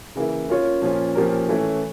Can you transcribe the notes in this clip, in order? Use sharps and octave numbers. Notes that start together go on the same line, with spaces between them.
C#3 E3 A#3 E4
A#3 C#4 F4 C#5
A#2 F3 A#3 C#4 F4
A#2 F3 C#4 G4 A#4
A2 E3 A3 C#4 E4